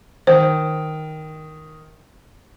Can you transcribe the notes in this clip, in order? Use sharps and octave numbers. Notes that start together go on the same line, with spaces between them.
D#3 C5